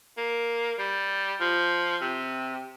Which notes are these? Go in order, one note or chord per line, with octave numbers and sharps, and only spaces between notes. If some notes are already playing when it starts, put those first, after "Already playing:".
A#3
G3
F3
C3